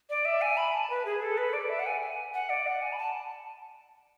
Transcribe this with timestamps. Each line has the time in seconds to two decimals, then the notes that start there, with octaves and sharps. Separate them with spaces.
0.10 D5
0.25 E5
0.42 G#5
0.57 B5
0.74 A5
0.90 B4
1.06 G#4
1.22 A4
1.38 B4
1.53 D5
1.69 E5
1.79 F#5
1.87 G#5
2.02 G#5
2.34 F#5
2.49 D5
2.67 F#5
2.82 G#5
2.93 B5
2.98 A5